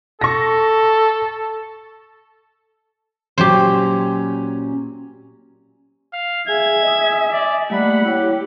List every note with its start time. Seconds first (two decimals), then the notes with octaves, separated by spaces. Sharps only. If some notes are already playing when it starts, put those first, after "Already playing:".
0.21 A4 C#6 A#6
3.38 A#2 F#3 C#4 G4 C5
6.13 F5
6.48 G#4 E5 G#5 G#6
6.83 D#5 G#5 D#6
7.32 D5
7.70 G3 A3 A#3 D5 F#5 B5
8.05 E4 G4 C#5